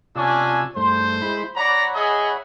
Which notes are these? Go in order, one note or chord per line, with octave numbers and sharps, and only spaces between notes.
C3 C#4 D4 F4 G#5 E6
G2 A3 C5
G#3 E4 B5
C#5 D5 F#5 A#5 B5
G#4 D#5 E5